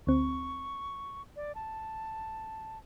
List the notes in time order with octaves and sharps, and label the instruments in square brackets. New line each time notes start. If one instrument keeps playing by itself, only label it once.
[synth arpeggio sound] D2 C4 [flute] C#6
[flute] D5
A5